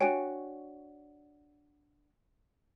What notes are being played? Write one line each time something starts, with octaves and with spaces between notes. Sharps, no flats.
D4 F#4 C#5 G5 G#5 D7